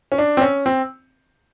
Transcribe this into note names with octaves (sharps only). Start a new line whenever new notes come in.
C#4
D4
C4
C#4
C4